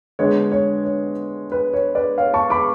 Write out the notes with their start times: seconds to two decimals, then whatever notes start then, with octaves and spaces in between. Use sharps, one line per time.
0.19 D3 G#3 B3 D4 C#5
0.52 C#5
0.85 C#5
1.52 B4
1.74 C#5
1.95 B4 D5
2.18 C#5 F5
2.34 A5 C#6
2.50 B5 D6